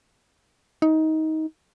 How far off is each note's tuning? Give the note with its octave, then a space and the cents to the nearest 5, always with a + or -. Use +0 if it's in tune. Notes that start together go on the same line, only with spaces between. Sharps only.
D#4 +20